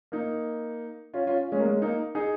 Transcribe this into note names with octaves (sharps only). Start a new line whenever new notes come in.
A#3 D#4
C#4 F4
C#4 F4
G#3 C#4
A#3
G#3 C#4
A#3 D#4
D#4 G#4